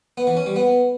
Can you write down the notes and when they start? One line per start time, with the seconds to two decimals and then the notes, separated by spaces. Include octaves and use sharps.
0.17 B3
0.27 E3
0.37 C#4
0.46 G3
0.56 B3